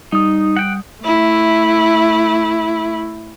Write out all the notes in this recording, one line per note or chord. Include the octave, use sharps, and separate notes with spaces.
G3 D#4 D#6
F#5 G5
A3 E4